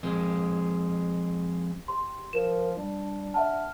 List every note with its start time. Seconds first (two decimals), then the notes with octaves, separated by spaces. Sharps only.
0.03 F2 G#3
1.88 G4 C6
2.33 F3 A#4 E7
2.77 G3 D4
3.34 E5 F#5 A5 F6